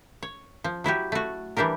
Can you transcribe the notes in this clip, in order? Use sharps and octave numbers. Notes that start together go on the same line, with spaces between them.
C#5
F3
F#3 E4 F#4 G4
A3 F#4
E3 G3 D4 G4 A#4